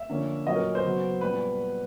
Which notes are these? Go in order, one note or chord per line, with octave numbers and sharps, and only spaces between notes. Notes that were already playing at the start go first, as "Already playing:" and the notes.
Already playing: E5
D3 F3 A#3 C#4
A#2 F#3 A#3 C#4 D#5
A#4
C5
C#3 F#3 B3
A#2 G3 B3 B4